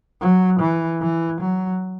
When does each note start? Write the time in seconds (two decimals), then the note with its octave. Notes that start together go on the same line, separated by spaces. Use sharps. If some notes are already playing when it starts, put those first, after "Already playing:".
0.21 F#3
0.60 E3
1.01 E3
1.41 F#3